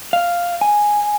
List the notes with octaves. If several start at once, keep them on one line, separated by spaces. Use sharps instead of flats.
F5
G#5